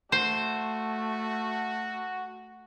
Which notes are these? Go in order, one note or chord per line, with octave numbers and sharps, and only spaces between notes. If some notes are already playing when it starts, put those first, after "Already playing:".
A3 F#4 C5